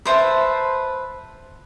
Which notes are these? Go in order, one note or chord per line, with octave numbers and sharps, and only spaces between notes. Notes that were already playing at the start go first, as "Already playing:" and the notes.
B4 C5 E5 A5